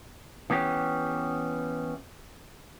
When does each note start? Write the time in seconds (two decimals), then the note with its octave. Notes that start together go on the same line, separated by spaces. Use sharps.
0.50 E3 B3 C#4 G4